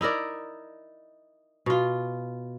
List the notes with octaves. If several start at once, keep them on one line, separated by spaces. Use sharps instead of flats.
D#4 E4 A#4 D5
B2 F4